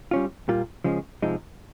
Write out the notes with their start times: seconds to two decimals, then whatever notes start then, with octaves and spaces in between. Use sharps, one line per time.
0.11 G3 C#4 F4
0.48 A#2 G3 A#3 F4
0.84 C#3 F3 G#3 C#4
1.22 C3 F3 G#3 D#4